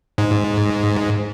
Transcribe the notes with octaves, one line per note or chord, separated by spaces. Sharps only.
G#2